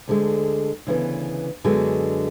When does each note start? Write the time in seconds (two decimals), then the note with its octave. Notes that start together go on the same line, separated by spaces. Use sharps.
0.08 D2 D3 G#3
0.87 D2 C#3 E3 B3
1.64 F#2 D3 G#3 B3 F#4